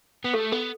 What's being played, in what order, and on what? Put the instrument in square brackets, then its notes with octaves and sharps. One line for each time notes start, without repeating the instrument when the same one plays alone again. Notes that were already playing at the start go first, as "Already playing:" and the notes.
[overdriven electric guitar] B3
[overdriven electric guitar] A3 [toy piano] A4
[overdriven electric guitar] B3 [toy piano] A4